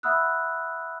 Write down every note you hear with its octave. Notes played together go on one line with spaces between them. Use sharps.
E5 F#5 B5 D#6 E6 F#6